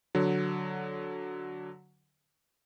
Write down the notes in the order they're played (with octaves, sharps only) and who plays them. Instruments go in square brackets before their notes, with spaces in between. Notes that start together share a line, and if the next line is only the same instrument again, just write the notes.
[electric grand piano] D3 F#3